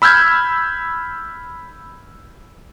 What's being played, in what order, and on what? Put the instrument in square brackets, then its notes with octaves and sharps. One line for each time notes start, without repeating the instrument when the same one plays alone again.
[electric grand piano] B5 E6 F6 G6 G#6